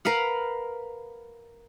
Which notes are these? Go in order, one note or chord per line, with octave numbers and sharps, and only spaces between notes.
A#4 B4 F5 F#5